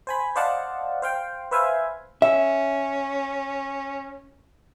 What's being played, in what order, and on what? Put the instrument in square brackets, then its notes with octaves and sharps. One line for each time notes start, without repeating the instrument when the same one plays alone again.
[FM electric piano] C5 G#5 B5
C5 D5 D#5 F5 F#5 A5
C5 F5 G5
B4 C5 E5 F5 G#5
[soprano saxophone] C#4 [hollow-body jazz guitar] E5